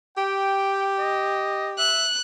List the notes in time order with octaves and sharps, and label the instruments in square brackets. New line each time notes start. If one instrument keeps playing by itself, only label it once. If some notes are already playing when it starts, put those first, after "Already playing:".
[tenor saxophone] G4 [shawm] G5
[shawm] D#5
[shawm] E5 [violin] F#6